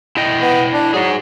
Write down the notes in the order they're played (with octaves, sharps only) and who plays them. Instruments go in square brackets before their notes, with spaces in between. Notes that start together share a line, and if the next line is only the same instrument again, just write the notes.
[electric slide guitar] E4 D#5 G5
[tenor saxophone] B3
D4
[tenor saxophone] F#3 [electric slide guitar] D#4 G#4